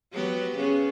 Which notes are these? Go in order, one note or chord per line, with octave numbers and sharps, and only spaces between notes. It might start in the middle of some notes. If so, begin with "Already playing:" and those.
F#3 B3 G4
C#3 B3